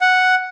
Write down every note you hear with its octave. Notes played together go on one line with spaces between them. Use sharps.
F#5